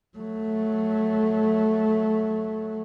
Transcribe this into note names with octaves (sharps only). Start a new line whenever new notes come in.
F#3 A3